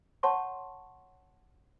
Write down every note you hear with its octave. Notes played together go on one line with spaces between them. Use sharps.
C#5 F#5 A5 C6 C#6